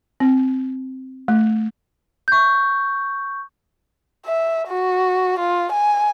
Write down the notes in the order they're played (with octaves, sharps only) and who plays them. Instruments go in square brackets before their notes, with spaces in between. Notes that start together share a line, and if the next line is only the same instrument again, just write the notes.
[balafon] C4
A3
[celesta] C#6 G6
[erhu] E5
F#4
F4
G#5